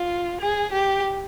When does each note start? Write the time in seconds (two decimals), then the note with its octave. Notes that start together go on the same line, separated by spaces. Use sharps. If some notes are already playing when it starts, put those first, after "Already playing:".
Already playing: F4
0.40 G#4
0.72 G4